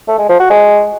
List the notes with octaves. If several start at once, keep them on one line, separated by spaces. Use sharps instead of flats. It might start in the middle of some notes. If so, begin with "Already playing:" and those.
A3
G#3
F3
F#4
G#3